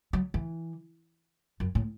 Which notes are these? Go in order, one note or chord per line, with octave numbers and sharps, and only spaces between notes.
F#3
E3
F#2
A2